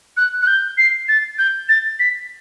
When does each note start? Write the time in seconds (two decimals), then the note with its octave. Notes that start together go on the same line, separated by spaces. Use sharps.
0.17 F#6
0.42 F#6
0.47 G6
0.78 C7
1.09 A6
1.39 G6
1.69 A6
1.99 B6